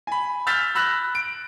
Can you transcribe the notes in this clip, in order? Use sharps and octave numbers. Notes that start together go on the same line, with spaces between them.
G#5 B5
E6 F6 G6 A6 B6
B5 E6 F#6 A#6
D7